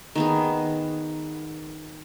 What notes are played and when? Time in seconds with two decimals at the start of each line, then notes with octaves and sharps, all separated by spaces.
0.15 D#3 B3 G#4